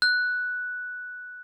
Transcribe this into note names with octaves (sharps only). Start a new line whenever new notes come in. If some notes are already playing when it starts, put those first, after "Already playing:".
F#6